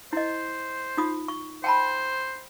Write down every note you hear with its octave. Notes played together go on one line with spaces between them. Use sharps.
E4 C5 D#5
D#4 F4 D#6
C#6
C5 G5 A5 B5